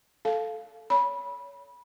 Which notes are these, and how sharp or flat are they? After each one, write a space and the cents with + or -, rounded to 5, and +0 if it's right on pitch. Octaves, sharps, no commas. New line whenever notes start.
A4 +0 F5 +0 A5 -35
C#5 +20 B5 -20